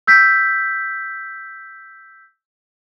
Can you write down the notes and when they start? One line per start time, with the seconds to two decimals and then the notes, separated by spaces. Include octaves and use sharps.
0.07 E6 G6 B6